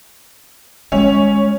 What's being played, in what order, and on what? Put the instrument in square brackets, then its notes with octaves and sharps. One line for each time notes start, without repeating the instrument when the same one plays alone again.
[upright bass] G#3 [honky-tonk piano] C#4